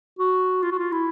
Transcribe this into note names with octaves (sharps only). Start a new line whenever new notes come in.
F#4
F4
F#4
F4
E4